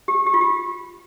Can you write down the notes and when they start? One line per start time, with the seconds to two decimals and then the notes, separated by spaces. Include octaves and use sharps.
0.08 G4
0.26 G4
0.34 F4
0.41 G4